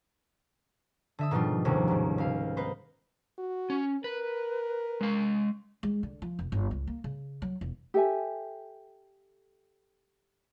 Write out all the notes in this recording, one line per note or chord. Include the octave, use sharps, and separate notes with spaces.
D3 E5 D#6
G#2 B2 D#3 F3 G3 F4
F1 D#2 C3 D#3 C#4
B1 G#2
C#2 F5
B3 D#4 B4 C5
F#4
C#4
A#4 B4
G#3 F5
G#3
D3
F3
F1
G1
C#2
A#3
C#3
F#3
E1
G4 A4 E5 G#5